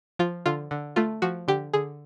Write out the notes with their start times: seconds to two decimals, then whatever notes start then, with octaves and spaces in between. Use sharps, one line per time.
0.19 F3 F4
0.46 D3 F4
0.71 D3
0.96 A3 F4
1.22 F3 F#4
1.48 D3 G4
1.73 D3 G#4